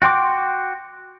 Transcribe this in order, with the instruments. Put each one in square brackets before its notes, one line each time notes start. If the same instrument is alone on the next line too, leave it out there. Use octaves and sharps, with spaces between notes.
[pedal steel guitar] F#4 G5 C6 D6